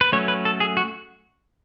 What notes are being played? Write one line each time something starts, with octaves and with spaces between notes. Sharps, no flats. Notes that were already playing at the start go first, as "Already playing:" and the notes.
B4
F#3 A3 C#4 C#5
B4
A4
G#4
F#4